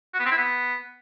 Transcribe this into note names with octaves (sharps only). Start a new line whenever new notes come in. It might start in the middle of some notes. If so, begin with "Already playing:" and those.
F#4
B3
C4
E4
B3